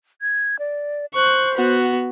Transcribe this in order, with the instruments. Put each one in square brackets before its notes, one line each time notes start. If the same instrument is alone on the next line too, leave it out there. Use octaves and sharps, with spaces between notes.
[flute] G#6
D5
[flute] C5 [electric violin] C#6 F#6
[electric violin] B3 F#4